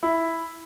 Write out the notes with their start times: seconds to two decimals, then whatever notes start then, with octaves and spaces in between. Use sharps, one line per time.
0.03 E4